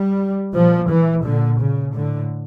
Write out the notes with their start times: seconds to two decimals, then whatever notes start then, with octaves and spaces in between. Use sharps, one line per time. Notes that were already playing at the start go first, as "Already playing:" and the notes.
Already playing: G3
0.55 A#2 F3
0.89 E3
1.24 A#2 D3
1.59 C#3
1.94 A2 D3